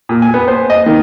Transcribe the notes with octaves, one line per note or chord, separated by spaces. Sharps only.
A#2
G#5
B3
C5
D#5
D#3